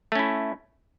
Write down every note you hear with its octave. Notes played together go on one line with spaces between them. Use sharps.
A3 C#4 E4